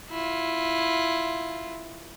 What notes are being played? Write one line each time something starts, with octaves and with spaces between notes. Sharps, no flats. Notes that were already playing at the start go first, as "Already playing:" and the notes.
E4 F4